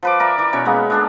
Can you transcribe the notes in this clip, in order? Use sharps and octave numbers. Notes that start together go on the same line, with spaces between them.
F3 B4 D6
A#4 D5 E5
E3 D5 D6
B2 C#4 C#5 E5
G#3 A#3 B3
G#3 D4 A4